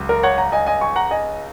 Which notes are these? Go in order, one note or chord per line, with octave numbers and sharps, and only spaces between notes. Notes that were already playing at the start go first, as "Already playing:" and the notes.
Already playing: C#2 F#3
A#4
C#5 F#5
F#5 A#5
D#5 G#5
D#5 G#5
G#5 C#6
F#5 A#5
D#5 G#5